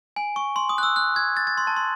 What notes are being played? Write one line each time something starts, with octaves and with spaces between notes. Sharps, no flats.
G#5
C#6
C6
D#6
F#6
E6
F#6
G#6
A6
A6
C6
A5
C6